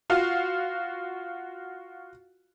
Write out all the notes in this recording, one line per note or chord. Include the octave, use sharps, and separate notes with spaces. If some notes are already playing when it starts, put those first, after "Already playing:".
F4 F#4 F5